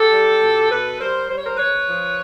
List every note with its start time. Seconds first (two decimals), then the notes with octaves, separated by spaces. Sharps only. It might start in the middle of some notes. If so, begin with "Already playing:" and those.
Already playing: G4 A4
0.13 G3
0.42 B2
0.71 B2 A4 B4
0.99 G3 A#4 C5
1.29 G3 C5
1.37 C#5
1.45 A#4 C5
1.58 G#2 B4 C#5
1.87 F3